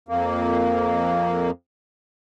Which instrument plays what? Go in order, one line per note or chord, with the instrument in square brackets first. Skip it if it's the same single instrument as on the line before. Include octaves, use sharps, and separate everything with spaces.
[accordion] F2 A#3